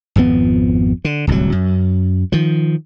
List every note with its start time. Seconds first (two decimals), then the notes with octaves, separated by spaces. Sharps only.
0.16 G#1 F2 F3 B3
1.05 D3
1.27 D1 C2 A#2 F#3
1.52 F#2
2.32 D#3 F3